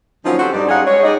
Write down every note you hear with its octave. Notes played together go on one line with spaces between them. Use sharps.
D3 F3 F#3 A#3 C#4 D#4
C4 F#4 G4 A4 C5
G2 D#4 D5
G3 C#4 D#4 F4 G#4 F#5
G#3 C#5
G3 D#4 G#4 D5 D#5